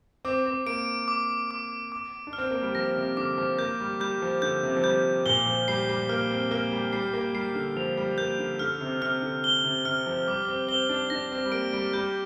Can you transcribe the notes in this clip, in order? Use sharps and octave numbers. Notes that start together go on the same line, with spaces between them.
C4 D6
C4
A#3 D7
D6
D6
D6
D4
F6
C4
A#3
G3
F3 A#6
C3
D3 D6
F3
A#3 G6
G3
G3 G6
F3
D3 G6
C3
F3
G3 G6
A#2 G7
F3
G3 C7
G3
A#3 F6
C4
A#3 F6
G3
G3 C7
A#3
G3 C7
D3
F3 F7
G3
A#3 G6
D3
D3 F6
C3
C3 F6
D3
G7
C3
C3 F6
F3
G3 D6
C4
C4 G7
D4
D4 A#6
C4
G3
A#3 D7
G3
G3 G6